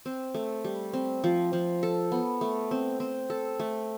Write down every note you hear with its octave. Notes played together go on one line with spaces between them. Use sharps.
C4
A3
G3
C4
F3
F3
A4
B3
A3
C4
C4
A4
A3